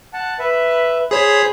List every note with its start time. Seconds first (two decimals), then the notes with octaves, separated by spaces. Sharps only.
0.13 F#5 A5
0.39 B4 E5
1.11 G#4 C5 C#5 G#5 B5